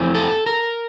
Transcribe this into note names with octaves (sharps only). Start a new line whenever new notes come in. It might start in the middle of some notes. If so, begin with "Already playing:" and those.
Already playing: F2 E3 A3 C4
A4
A#4